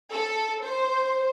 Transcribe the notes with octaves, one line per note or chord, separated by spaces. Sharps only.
A4
C5